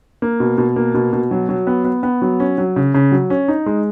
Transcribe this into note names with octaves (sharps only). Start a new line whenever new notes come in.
A#3
B2
B2
A#3
B2
B2
F#3
F#3
B3
B3
B3
F#3
C#4
F#3
C#3
C#3
F#3
C#4
D#4
G#3